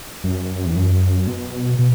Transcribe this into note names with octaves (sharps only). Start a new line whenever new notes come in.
F#2
E2
F#2
B2
B2